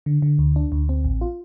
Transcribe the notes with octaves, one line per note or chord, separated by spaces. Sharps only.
D3
D3
D2
D4
D2
C4
A1
F4